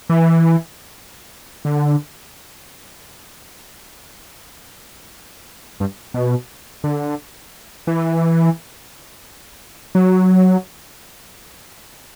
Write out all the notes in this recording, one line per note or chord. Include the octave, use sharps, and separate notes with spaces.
E3
D3
G2
B2
D3
E3
F#3